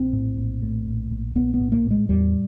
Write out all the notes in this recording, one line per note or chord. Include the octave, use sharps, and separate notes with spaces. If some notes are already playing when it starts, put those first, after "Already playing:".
Already playing: A#1 C4
A2
A#1
A2
A#1
A#1
A#1 B3
B3
A2
A#3
A2
G#3
E2 G3